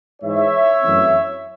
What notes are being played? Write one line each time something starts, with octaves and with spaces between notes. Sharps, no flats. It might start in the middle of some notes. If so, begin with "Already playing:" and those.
G#2 E3 G#3 C#5 E5
F#2 E3 A3 C4